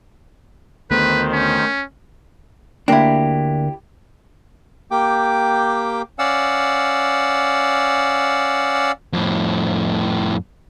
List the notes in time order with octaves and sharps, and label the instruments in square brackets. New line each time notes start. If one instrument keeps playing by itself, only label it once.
[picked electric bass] D2 A3 B3 [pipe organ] D#3 C5 [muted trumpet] B4
[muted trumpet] C#4
[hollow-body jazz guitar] D2 A#3 D4 [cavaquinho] E4 G4
[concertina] A#3 G4 G5 D6
C#4 D5 F5 F#5 E6
[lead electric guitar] F2 A2